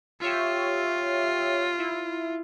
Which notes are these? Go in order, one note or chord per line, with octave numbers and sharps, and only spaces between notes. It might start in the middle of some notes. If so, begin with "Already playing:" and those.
F4 G4 C#5 E5
E4